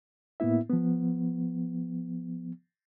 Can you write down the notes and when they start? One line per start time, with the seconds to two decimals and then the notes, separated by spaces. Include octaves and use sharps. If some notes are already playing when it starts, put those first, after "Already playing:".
0.40 A2 A#3 B3 E4 E5
0.70 F3 B3